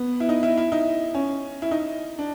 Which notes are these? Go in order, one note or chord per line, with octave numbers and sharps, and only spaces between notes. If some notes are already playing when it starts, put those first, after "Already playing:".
Already playing: B3
E4
D#4
E4
E4
D#4
C#4
E4
D#4
D4